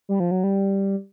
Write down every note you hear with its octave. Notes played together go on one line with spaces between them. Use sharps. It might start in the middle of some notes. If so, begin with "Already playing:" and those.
G3
F3
F#3
G3